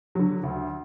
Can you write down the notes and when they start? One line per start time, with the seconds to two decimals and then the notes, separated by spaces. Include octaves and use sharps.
0.15 D3 F#3
0.43 D2